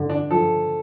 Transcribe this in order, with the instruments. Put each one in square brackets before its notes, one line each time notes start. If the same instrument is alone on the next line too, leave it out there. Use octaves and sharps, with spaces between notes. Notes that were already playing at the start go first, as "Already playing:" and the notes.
Already playing: [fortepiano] D3
[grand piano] D4
[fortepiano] F3 [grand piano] A4